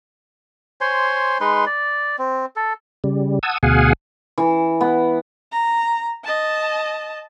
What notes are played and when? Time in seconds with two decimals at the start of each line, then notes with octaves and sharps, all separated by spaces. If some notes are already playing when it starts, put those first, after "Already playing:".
0.81 C5 C#5 G#5 C6
1.41 G#3 D#4 B4 C6
1.66 D5
2.18 C4
2.56 A4
3.04 C#3 G3
3.43 F#5 A5 D#6 E6 G#6
3.63 D2 B2 G#4 F5 F#5 G#5
4.38 E3
4.81 B3
5.52 A#5
6.24 D#5 A5